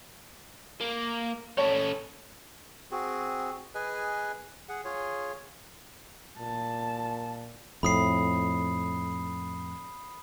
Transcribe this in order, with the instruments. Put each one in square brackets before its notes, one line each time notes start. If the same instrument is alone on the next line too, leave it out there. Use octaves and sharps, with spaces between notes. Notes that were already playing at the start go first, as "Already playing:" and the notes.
[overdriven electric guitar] A#3
[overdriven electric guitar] C#4 A4 [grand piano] C#5
[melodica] C4 F#4 G#4
G#4 B4 D#5 G#5
G#4 F#5
F4 G#4 C#5
[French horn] A#2 [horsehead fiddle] A5
[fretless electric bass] F2 A2 [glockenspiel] B5 D#6 C7